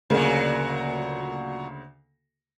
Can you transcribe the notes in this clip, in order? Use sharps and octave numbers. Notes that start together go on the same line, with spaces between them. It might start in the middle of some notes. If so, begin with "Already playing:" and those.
D2 A#2 C#3 F#3 A#3